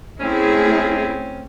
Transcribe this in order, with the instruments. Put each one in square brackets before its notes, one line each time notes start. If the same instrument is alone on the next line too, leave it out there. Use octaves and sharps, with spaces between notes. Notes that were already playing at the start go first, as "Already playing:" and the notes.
[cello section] A3 E4 G#4 [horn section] C4 C#4